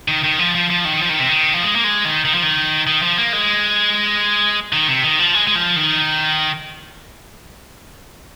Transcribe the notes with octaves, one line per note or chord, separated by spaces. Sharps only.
D#3
D#3
F3
F3
F3
D#3
F3
D#3
C3
D#3
F3
G#3
A#3
G#3
D#3
D#3
F3
D#3
D#3
F3
A#3
G#3
D#3
C3
D#3
F3
G#3
G#3
F3
D#3